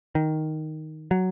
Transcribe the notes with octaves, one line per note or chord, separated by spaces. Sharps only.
D#3
F#3